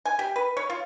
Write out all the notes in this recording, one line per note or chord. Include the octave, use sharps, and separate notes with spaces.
G#5
G4
B4
C#5
F4